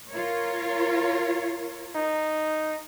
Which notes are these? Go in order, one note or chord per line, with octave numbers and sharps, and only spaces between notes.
F4 A#4 C#5
D#4